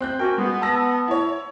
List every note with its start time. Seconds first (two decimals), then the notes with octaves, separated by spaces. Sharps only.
0.01 C4 F#6 G6
0.19 A#3 C#4 F#4 G5
0.38 G#3 B3
0.62 A5 E6 A#6
1.08 E4 C#5